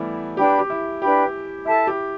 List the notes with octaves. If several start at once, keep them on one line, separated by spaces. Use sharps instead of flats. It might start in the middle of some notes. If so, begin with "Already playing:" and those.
Already playing: E3 G3 A3 B3 E4
D4 G4 B4 G5 B5
G4
E4
D4 G4 B4 G5 B5
E4 A4 E5 A5
G4